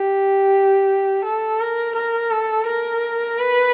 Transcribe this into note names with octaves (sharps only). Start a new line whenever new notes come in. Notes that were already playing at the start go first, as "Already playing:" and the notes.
Already playing: G4
A4
A#4
A#4
A4
A#4
B4